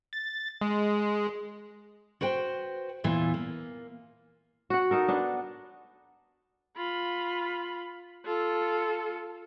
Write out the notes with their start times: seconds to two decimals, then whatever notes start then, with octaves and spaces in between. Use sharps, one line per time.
0.13 A6
0.61 G#3
2.21 F#4 B4 C5 G5
3.04 E2 A#2 E3 F4
3.34 A#3
4.70 F#4 F#5
4.91 D#4 A4 A#4
5.08 B3 D4
6.76 F4 B5
8.25 F4 A4